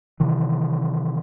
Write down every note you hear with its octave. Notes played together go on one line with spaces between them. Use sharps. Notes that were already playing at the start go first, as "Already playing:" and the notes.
C3 D#3 E3